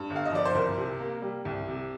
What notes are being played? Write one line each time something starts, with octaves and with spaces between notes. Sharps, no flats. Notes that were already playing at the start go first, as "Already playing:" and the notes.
Already playing: G2
G1
F5
D#5
F3 D5
C5
C2 A#4
C3
A#3
G3
C2
C3